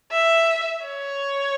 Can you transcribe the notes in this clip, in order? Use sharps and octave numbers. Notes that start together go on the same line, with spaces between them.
E5
C#5